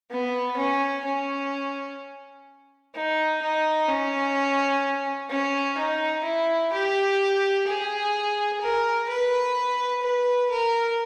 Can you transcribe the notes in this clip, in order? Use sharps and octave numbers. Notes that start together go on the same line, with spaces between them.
B3
C#4
C#4
D#4
D#4
C#4
C#4
D#4
E4
G4
G#4
A#4
B4
B4
A#4